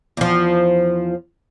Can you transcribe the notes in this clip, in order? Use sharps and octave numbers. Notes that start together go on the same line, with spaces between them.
E2 F3